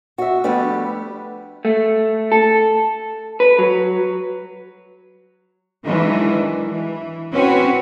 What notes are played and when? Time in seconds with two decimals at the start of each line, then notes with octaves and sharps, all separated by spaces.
0.18 F#4 E5
0.44 F3 G3 A3 B3 D4
1.65 A3
2.32 A4
3.40 B4
3.59 F#3
5.85 D#3 E3 F#3 G#3 D4
6.66 E3
7.33 C4 C#4 F#4 B4 C#5